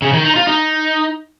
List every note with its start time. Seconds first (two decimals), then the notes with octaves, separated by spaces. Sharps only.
0.02 C#3
0.13 D#3
0.25 D#4
0.36 F4
0.47 D#4